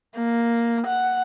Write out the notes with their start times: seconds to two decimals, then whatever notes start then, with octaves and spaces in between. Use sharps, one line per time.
0.16 A#3
0.86 F#5